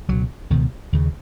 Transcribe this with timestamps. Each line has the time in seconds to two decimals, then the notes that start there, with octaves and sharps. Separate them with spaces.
0.08 C#2 B2 F#3
0.50 C#2 B2 D#3
0.93 D#2 C#3